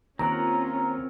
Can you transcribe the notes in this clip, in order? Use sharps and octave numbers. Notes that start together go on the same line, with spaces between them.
D#2 C4 C#4 F4 A#4 F#5 A#5